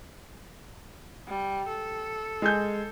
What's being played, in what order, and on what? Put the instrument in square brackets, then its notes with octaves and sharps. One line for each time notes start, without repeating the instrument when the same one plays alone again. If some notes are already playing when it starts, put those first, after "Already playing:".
[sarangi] G3
A4
[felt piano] G#3 G#5 G6